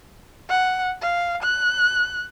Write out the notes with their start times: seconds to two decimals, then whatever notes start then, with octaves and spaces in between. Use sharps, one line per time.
0.49 F#5
1.01 F5
1.43 F#6